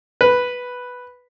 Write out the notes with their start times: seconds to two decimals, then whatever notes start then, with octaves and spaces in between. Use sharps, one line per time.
0.21 B4